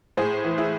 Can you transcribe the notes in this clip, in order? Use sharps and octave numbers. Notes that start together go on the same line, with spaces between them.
A2 G#4 C5
E3
E4 G#4